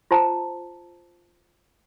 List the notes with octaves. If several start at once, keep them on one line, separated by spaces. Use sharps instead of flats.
F4 C5 A5 A#5